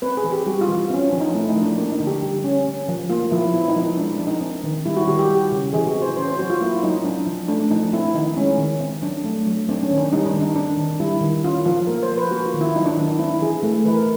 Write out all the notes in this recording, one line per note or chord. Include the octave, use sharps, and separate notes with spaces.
C4 B4
G#4
E3
G4
G3 F#4
F4
E3
F4
C4 C#4
F3 D4
D#4
A3 E4
D#4
F3
D4
A#3 D4
D#4
D3
G4
G3
C#4
C#4
F3
A#3 F4
F3 E4
B3 E4
D#4
F3
D#4
G#3 D4
D4
F3
D#4
C4
D#3
G3 E4
F#4
D#3 G4
G4
G3
C#3
E3 G#4
F#4
C4
C5
C#4 C5
C5
F#3 F#4
F4
A#3 E4
F#3 D#4
C4 D4
F3
A3 D4
F3 D#4
C4 E4
D#3 D#4
G#3 C#4
D#3
C4
F#3 D4
A3
F#3
C4 D4
C#4
D#3
D4
G3 D#4
D4
D#3
D#4
C4 D4
D#3
G3 E4
D#3
C#4 F4
F3 F4
A#3 A#4
C5
F3
B4
A#3 F#4
F4
D#3
E4
F#3 D#4
D4
D#3 D4
D#4
C4 E4
E3 G#4
A3 A4
E3 B4
A#4